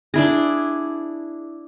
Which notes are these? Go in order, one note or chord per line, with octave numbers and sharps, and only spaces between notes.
D4 E4 G#4